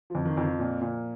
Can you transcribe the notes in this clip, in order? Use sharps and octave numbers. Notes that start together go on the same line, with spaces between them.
F2 F3
D#3
F2
F3
A#2
A#2